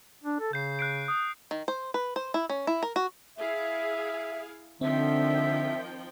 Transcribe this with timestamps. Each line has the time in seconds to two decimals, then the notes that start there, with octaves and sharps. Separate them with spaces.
0.24 D4
0.40 A4
0.53 C#3 G6 C7
0.79 F#6 C7 D7
1.08 D#6
1.51 D#3
1.68 C5
1.94 B4
2.16 C5
2.34 E4
2.50 C#4
2.67 E4
2.83 A#4
2.96 F#4
3.37 E4 G#4 E5 F5
4.81 D3 D#3 F3 C4 E5 G5